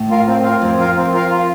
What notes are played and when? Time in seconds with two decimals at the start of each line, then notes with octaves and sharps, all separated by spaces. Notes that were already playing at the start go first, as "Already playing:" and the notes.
Already playing: A2
0.10 F4 A#4 F5
0.27 C4
0.44 F4 A#4 F5
0.62 F2 C4
0.79 F4 A#4 F5
0.97 C4
1.13 F4 A#4 F5
1.31 F4